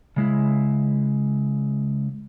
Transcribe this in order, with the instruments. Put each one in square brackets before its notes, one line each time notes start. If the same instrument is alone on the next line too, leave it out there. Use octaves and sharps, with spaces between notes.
[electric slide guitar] C#3 G#3 E4